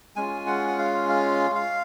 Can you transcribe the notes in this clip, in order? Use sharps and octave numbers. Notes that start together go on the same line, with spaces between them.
G#3 C#4 F4 G#5
F#5
F#5
F5
F5
F5